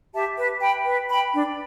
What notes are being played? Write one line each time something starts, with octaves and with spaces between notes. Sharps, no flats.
G4 E5 A5
B4
G5 B5
B4
G5 B5
D4